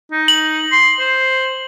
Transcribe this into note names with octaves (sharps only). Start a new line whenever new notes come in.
D#4
F#7
C6
C5